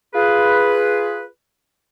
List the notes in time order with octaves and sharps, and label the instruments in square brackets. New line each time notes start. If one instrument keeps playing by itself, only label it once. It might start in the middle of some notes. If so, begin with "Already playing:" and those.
[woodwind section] F4 G#4 B4